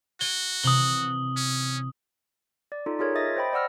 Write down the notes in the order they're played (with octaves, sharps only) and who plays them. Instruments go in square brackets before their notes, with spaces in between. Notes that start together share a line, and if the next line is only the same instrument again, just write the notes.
[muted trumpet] F#4 [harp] G#6 D7 D#7 [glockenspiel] G7
[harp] C3 E3 [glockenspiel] D#6 F#7 G7
[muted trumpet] C#4
[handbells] D5
D#4 F4 A4
F4 G#4 A#4 C#5
D#5 E5 D#6 A6 A#6
C5 D#5 G5 B5
D5 F#5 E6 F6 A#6